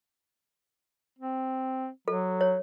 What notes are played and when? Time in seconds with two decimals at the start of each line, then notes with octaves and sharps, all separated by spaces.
1.19 C4
2.08 F#3 A4
2.41 C#5